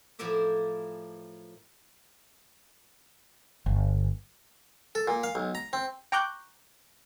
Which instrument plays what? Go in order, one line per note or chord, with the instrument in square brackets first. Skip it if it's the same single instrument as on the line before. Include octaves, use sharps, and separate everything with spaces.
[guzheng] A2 F3 E4 A#4 D5 E5
[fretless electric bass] G1
[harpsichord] A4
A#2
F5
B1
A#5
C4
[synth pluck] G5 A#5 C#6 D6 F#6 G6